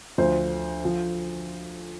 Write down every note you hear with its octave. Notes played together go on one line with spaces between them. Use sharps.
D2 D3 F3 C5
F3